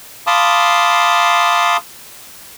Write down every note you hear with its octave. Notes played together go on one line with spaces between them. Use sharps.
F5 A5 B5 C6 D6 D#6